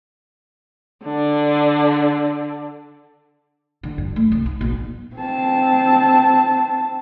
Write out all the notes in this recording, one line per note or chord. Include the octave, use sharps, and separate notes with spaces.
D3 D4
D3
G2
A3
C2
D#4
A#1
C4 A5